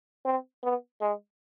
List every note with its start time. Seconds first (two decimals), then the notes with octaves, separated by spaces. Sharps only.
0.25 C4
0.63 B3
1.01 G#3